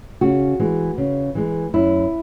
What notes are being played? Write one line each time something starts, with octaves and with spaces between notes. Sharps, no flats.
C#3 F#4
E3 G#3
C#3
E3 G#3
F#2 E4